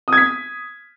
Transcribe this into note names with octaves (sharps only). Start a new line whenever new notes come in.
D#6 G#6 B6